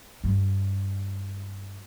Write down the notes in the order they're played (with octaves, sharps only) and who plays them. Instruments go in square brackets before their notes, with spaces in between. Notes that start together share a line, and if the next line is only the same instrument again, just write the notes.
[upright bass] G2 G3